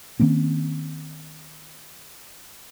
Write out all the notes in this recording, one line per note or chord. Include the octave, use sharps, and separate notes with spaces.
D#3 A#3 C4 C#4